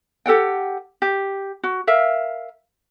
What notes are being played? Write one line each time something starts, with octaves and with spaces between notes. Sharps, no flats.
G4 A4 F#5 G5
G4
F#4
A#4 E5 F5